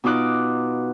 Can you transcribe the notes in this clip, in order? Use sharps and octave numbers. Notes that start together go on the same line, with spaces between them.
B2 D#4 F4 D6 F#6